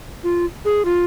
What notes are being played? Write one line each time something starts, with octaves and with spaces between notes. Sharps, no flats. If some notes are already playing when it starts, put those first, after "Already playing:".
F4
G#4
F4